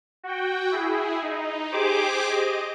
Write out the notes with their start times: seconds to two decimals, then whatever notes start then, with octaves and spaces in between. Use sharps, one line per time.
0.23 F#4 G5
0.71 E4 G#4
1.23 D#4
1.71 G4 G#4 C5 D6
2.30 D#5